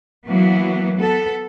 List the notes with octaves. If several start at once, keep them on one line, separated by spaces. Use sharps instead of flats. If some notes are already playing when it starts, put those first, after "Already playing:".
E3 F#3 A#3 B3
B3 A4